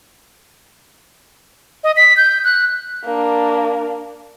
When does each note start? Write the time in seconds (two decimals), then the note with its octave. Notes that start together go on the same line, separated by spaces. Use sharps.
1.84 D#5
1.97 B6
2.17 G6
2.44 F#6
3.04 A#3 D4